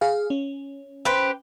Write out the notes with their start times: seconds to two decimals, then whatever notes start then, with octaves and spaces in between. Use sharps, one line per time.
0.01 G#4 F5
0.30 C#4
1.05 G4 B4 C5